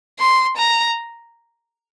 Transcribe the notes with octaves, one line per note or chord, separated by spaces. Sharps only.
C6
A#5